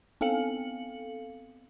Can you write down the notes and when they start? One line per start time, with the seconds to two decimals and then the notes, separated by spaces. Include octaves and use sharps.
0.21 B3 C4 A4 F5 C#7 F#7